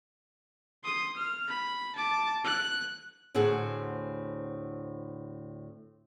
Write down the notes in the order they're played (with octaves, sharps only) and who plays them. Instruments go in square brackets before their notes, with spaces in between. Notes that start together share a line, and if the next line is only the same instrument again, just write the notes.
[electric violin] C6 D#6
F6
B5
A5 D6
F#6
[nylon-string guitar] D2 A2 C4 G#4 F#5